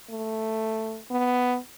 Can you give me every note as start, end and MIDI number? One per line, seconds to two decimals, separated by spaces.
0.10 0.99 57
1.11 1.57 59